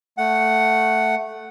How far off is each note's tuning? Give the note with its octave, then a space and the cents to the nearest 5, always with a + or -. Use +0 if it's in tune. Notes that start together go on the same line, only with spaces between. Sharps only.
A3 +0 F#5 +0